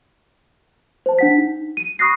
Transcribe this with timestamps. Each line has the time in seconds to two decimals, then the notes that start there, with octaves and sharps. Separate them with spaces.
1.06 C5 A5
1.19 D4 F#5 B6
1.38 D#4
1.77 D#7
1.99 B5 C#6 D#6 F#6 A#6 C7